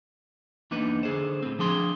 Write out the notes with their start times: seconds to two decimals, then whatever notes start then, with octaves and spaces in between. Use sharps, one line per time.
0.71 E2 A#3 D4 D#4 B4
1.03 D3 G#4 C5
1.42 A2 C4
1.59 F3 D4 G#4 C6